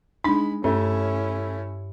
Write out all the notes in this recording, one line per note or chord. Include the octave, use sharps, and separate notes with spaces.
G#3 D4 D#4 B5
G2 A3 C#4 E4